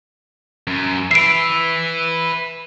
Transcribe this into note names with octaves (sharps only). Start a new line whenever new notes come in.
F#2
B4 E5 C7 D7